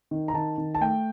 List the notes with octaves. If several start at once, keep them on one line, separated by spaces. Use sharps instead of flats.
D#3
A#5
D#3 A5
D#3
A5
A3 G5